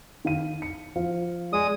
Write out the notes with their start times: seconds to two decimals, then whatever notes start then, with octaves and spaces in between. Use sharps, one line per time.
0.25 D#3 F5 D#7
0.62 C#7
0.96 F3 F5
1.53 G#3 D5 D#6